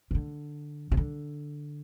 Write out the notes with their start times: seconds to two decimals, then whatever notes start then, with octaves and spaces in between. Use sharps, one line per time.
0.11 C3
0.15 D3
0.92 C3
0.97 D3